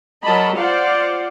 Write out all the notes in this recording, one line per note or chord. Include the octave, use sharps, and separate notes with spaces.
F#3 A#4 D#5 A5 B5
F4 C5 D5 F5 F#5